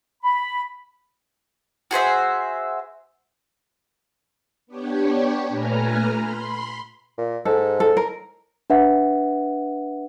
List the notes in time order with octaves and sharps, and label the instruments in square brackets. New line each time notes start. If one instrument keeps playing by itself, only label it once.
[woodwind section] B5
[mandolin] F#4 G#4 C5 E5
[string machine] B3 D4 G4 C#5
A#2 A3 B4 G#5 A#5 F6
B5 C6
[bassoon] A#2
[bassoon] G#2 [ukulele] A4
[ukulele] A4
A#4
[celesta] D4 B4 E5 F#5